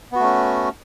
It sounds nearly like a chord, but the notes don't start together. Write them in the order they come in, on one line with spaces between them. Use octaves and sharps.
B3 F#4 A3 C#4